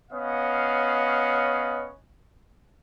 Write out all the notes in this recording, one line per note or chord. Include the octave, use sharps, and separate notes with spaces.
B3 C#4 D#5 F5